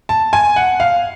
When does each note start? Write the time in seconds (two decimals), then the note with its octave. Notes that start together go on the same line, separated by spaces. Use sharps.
0.09 A5
0.33 G#5
0.56 F#5
0.80 F5